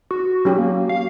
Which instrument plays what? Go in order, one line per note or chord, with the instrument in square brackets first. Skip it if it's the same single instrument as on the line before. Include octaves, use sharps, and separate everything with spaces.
[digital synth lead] F#4
[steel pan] F#3 C#4 G4
[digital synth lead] A#3
F5